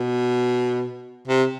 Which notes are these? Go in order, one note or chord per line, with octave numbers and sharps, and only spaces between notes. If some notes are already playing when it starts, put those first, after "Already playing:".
Already playing: B2
C3